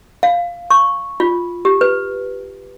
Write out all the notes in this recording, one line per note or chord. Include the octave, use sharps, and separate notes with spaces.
F5
C#6
F4
G4
B4